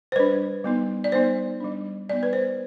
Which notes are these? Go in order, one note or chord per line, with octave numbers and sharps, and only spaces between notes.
C5
G3 D4 B4
G3 B3 D#4
D5
G3 B3 D#4 C5
G3 D4
G3 B3 D#4 D5
B4
C5